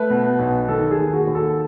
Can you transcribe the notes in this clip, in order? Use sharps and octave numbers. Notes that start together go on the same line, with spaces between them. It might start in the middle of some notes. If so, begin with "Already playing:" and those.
Already playing: A3 B4
B2
B1
D#3 A4
G#4
D#2
F#4
D#2
A4